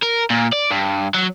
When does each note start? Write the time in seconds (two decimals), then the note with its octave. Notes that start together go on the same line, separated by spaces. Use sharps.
0.02 A#4
0.30 A#2
0.53 D5
0.71 G2
1.14 F#3